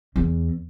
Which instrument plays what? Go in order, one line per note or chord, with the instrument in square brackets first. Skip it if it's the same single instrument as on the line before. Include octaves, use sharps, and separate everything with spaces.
[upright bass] E2